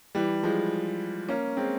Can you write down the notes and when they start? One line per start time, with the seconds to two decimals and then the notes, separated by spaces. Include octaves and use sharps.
0.15 E3 G3
0.43 F3 G#3
1.29 A#3 C#4
1.57 G#3 C4